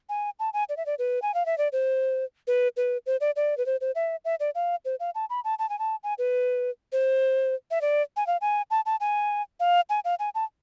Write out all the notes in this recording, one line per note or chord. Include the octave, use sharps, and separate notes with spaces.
G#5
A5
G#5
D5
E5
D5
B4
G#5
F5
E5
D5
C5
B4
B4
C5
D5
D5
B4
C5
C5
E5
E5
D5
F5
C5
F5
A5
B5
A5
A5
G#5
A5
G#5
B4
C5
E5
D5
G#5
F5
G#5
A5
A5
G#5
F5
G#5
F5
G#5
A5